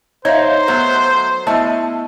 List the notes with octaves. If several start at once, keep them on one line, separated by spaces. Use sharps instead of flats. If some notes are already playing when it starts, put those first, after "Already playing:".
D#4 C5 C#5 E5 F5
F#3 A3 B3
A3 B3 E4 D#5 A5